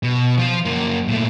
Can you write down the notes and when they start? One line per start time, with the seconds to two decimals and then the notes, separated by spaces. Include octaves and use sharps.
0.03 B2
0.37 F3 F4
0.65 F#2 A#3
1.08 A#2 A3